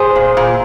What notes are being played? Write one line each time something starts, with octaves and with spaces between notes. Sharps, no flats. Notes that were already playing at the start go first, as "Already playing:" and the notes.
Already playing: G#4 C5
A#2
A#2